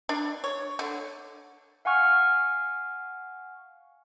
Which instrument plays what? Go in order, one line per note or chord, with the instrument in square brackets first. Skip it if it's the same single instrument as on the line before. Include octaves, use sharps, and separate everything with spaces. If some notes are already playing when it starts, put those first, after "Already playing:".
[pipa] D4
C#5
D3
[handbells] F5 F#5 G#5 C#6 F6